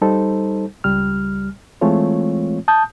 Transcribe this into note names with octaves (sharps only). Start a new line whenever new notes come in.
G3 D#4 A4 C5
C#2 G3 F6
E3 G#3 A3 C4 F4 C#5
A5 D#6 G6